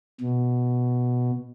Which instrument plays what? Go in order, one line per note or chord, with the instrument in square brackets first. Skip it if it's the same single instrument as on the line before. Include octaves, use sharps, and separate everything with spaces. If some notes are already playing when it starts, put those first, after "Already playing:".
[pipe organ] B2